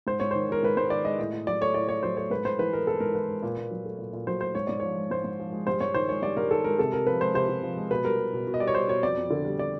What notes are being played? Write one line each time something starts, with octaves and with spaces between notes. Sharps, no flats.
G#2 C5
G#2 C#5
D#3 C5
G#3 A#4
G#2 B4
G#2 C5
D#3 D5
G#3 D#5
A2
A2
F#3 D5
A3 C#5
A2 D5
A2 C#5
F#3 C5
A3 C#5
G#2 B4
G#2 C5
E3 B4
G#3 A#4
G#2 A4
G#2 A#4
E3 B4
G#3
A#2
A#2
F#3
A3
A#2
A#2
F#3 C5
A3 C5
G#2 C#5
G#2 D5
F3 C#5
G#3
G#2 C5
G#2
F3
G#3
G2 C5
G2 C#5
D#3 C5
G#3 C#5
G2 D5
G2 A#4
D#3 A4
G#3 A#4
C3 A4
C3 A#4
F3 B4
G#3 C5
C3 C5
C3
F3
G#3
B2 B4
G3 A#4
G3
B2
B2
D#5
G3 D5
C#5
G3 C5
B2 C#5
F2 D5
F2
D3
G3
D5